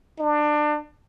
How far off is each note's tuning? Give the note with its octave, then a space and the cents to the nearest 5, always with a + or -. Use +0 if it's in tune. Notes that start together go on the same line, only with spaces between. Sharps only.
D4 +25